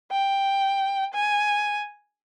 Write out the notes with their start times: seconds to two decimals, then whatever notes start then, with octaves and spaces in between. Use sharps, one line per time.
0.11 G5
1.14 G#5